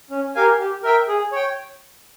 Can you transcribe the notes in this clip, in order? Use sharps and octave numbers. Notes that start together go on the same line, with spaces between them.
C#4
G4 A#4 F5 G#5
G4
A#4 E5 G5
G#4
C#5 G5